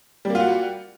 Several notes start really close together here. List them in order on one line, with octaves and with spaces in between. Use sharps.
G3 A#3 F4 F#4